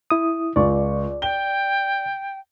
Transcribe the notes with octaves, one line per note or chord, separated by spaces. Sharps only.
E4 D#6
C#2 F4 D5 C#6
G5 G7